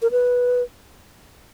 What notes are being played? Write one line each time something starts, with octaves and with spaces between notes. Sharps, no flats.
A#4
B4